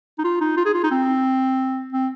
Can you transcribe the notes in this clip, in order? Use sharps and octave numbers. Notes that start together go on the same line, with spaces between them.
D#4
F4
D#4
F4
G#4
F4
D#4
C4
C4